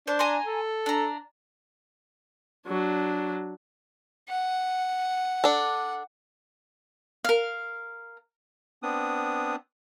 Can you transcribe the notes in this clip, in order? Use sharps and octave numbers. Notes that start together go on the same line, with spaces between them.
D4 C5
G#5 A#5 C6
A4
D4 A#5
F#3 D4
F#5
D4 A4
A#4 F5
B3 C4 D4 D#6